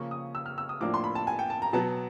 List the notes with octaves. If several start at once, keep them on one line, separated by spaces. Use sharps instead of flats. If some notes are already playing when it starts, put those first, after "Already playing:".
Already playing: C#3 F3 A#3 C#6
D#6
E6
F6
E6
D#6
A2 F3 A#3 D4 D6
C6
B5
A5
G#5
G5
A5
A#5
B2 F#3 B3 A5